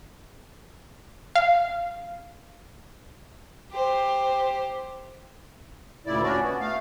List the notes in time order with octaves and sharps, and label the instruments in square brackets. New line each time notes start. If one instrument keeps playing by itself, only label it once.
[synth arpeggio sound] F5
[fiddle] G4 C5
[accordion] D2 A#2 C#3 E4 D5
C#4 D4 F#4 D5
B3
A3 F5